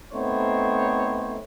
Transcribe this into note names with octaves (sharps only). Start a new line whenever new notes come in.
A3 B3 C4 D#4 C5 C#5